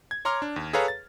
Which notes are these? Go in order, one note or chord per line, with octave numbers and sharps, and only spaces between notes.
G#6
C#5 A#5 C6 D6 F6
D4
D#2
G#4 A4 B4 C#5 F5 A#5
A6